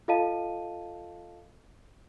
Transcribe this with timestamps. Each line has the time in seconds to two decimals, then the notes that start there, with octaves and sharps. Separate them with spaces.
0.08 F4 A4 D#5 F5 A5 D#7